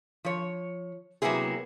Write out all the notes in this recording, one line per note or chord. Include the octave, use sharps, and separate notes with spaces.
F3 C#5
C3 F#3 A#3 B3 E4 G#4